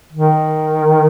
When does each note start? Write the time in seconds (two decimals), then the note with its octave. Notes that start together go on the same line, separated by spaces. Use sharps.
0.13 D#3